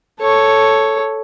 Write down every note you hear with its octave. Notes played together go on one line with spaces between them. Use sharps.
A4 C#5